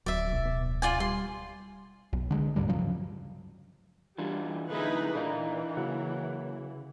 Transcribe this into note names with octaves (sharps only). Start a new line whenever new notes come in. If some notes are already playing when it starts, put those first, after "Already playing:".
D1 F#3 D5 E5
B1
B2
F4 D5 G#5
G3 C6
B1
D3 F3 G#3
D2 G#2 D3 G3
G2 C#3 F3 F#3
E3 G3 D4 F4 F#4
D3 A3 D#4 E4 G#4 B4
A#2 E3 D4 D#4 F4 A#4
C#3 F#3 A#3 F#5